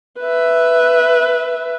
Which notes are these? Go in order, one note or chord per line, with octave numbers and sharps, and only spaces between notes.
B4 E5